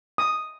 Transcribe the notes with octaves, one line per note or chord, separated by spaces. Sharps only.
D#6